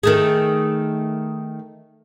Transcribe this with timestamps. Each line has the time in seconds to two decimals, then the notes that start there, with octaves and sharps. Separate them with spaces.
0.03 D#3 A3 G#4